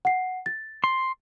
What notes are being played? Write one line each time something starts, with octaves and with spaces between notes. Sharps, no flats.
F#5 C7
A6
C6